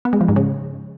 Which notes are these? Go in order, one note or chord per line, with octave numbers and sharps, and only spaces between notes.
B3
G#3
F3
G#2
C#3